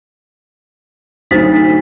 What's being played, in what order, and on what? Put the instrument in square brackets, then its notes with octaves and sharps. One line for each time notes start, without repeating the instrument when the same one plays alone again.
[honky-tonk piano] D2 F#3 [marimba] D#4 [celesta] C5 A6 B6